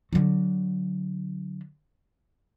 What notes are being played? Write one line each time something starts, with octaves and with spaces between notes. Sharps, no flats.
D3 F#3